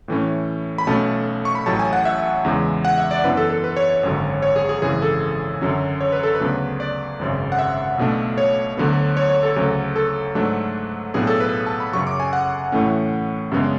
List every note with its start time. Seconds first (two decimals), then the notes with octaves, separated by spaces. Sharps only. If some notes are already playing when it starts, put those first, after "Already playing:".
0.08 A2 E3 A3 C#4
0.78 B5
0.87 B1 B2 A3 C#4 A5
1.45 C#6
1.55 B5
1.66 A1 A2 F#3 A5
1.79 G#5
1.93 F#5
2.05 E5
2.45 E2 C#3 E3 G#3
2.85 F#5
2.98 E5
3.11 D5
3.24 F#2 E3 B3 D4 B4
3.37 A4
3.50 A4
3.64 B4
3.77 C#5
3.90 C#5
4.03 G#1 F#2 D3 F#3
4.42 C#5
4.56 G#4
4.69 G#4
4.82 G#1 F#2 C#3 E3 G#4
5.02 A4
5.61 F#2 D3 F#3 C#4
6.01 C#5
6.12 B4
6.23 A4
6.35 B4
6.40 D2 C#3 F#3 B3 D4
6.80 D5
7.19 G#1 F#2 C#3
7.52 F#5
7.59 E5
7.98 B1 B2 A3 D4
8.38 C#5
8.77 D2 D3 F#3 B3
9.17 C#5
9.30 C#5
9.43 A4
9.56 D2 C#3 F#3
9.96 A4
10.35 G#2 F#3 A3 D4
11.14 B1 A2 F#3 B3 D4 G#4
11.27 A4
11.40 B4
11.66 A5
11.80 B5
11.93 F#2 C#3 F#3 C#6
12.07 D6
12.20 G#5
12.33 F#5
12.72 A2 E3 A3 C#4
13.51 F#2 C#3 G#3 B3 D4